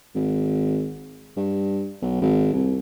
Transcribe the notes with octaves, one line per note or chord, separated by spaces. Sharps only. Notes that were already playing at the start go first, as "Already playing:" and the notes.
G#1
G2
B1
G#1
C2